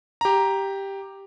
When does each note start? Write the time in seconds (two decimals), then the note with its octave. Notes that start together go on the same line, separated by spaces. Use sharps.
0.21 G4 A#5